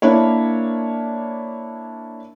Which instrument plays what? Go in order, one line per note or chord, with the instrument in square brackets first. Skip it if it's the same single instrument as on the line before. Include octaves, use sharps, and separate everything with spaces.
[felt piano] A#3 D4 E4 A#4 C#5